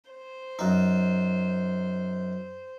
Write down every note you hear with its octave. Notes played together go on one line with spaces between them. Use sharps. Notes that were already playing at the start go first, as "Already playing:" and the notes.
C5
F#2 D#4